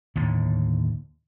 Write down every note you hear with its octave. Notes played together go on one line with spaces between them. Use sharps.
D#2 A2 D3